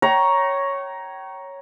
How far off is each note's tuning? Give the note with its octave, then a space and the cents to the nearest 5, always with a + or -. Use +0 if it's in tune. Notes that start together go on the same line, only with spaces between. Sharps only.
C#5 +0 G5 -35 A#5 +10